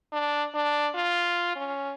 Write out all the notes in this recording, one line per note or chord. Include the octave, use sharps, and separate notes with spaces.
D4
D4
F4
C#4